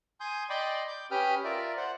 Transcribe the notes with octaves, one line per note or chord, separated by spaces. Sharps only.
G#5 C6 D#6 G6
D5 D#5 G5 B5 C6 D6
D6 G6
C#4 G4 B4 G5 D#6 F6
F4 A#4 D5 E5
C5 F#5